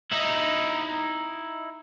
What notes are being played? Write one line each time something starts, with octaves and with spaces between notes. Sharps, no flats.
D#4 E4